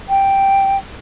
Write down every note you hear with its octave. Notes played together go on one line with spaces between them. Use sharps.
G5